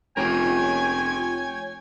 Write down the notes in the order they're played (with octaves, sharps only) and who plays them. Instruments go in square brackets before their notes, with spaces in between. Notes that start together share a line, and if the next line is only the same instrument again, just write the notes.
[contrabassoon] F1 [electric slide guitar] F4 G4 A#4 [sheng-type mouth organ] C#5 G5 [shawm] G#5